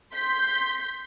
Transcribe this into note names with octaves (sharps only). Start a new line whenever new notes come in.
C6 G6 B6